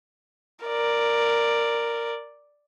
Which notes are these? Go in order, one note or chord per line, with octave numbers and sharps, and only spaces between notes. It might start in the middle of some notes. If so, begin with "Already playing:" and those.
A#4 D5